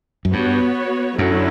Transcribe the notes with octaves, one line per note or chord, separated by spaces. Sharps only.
F#2
G2 B3 F#4 C#5
F#2 D3 F#3 C#4 E4